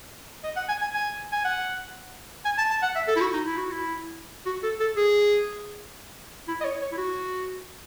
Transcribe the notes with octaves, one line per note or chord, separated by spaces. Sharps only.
D#5
F#5
G#5
G#5
G#5
G#5
F#5
G#5
A5
A5
F#5
E5
A4
E4
F#4
D#4
E4
F#4
E4
F#4
A4
A4
G#4
E4
D#5
C#5
C#5
E4
F#4